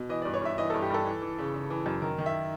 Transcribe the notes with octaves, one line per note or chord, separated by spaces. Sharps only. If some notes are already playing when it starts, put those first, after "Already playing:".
Already playing: B2
E3 D#5
D5
G2
C#5
G2 E5
E3 D#5
A4
G2
G4
G2 A4
E3
E3
C#3
C#3
E3
F#2
D#3 A#4
D#3
E5